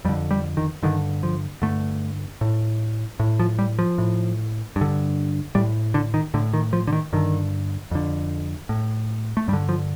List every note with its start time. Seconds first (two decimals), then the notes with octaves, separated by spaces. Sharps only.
0.05 F2 G3
0.08 D3
0.31 G3
0.57 D#3
0.83 G2 D3 D#3
1.23 F3
1.62 G2 D3 A3
2.41 A2
3.20 A2
3.39 F3
3.59 G3
3.79 F3
3.98 A2
4.76 G2
4.81 D3
5.55 A2 G3
5.94 D3
6.14 D#3
6.34 A2 D3
6.53 D#3
6.73 F3
6.87 D3
6.93 D#3
7.13 G2 D3 D#3
7.91 F2 D3
8.69 A2
9.37 A3
9.48 G2 G3
9.53 D3
9.69 F3